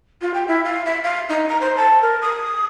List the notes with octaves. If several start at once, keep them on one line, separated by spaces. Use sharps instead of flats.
F4
G5
E4
F5
E5
F5
D#4
A#5
C5
A5
A#4
D#6